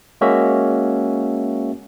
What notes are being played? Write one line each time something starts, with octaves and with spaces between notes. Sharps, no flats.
G#3 A#3 C#4 F#4 E5